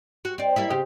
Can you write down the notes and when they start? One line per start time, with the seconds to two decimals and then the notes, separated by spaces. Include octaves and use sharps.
0.25 F#4
0.38 C4 D5
0.56 G3 A#3 E4
0.70 C#3 C4 G4